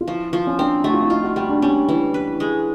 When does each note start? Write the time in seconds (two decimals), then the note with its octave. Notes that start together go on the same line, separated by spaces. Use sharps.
0.01 F4
0.07 F3 E4
0.33 F3
0.47 C#4
0.59 C4 D4
0.84 A3 F#4
0.94 F4
1.02 E4
1.10 D#4 F4
1.24 F#4
1.36 G3 F#4
1.49 D4
1.62 G3 C#4
1.89 E3
2.14 B4
2.40 G#3